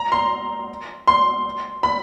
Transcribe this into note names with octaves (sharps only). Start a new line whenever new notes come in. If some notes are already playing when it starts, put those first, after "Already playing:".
Already playing: A#5
C6
C6
B5